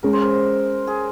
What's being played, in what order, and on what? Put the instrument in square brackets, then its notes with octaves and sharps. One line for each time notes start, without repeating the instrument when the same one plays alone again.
[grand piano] G#3 C#4 G#4 [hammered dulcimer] A#4
[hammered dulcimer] C5
A#4
G#4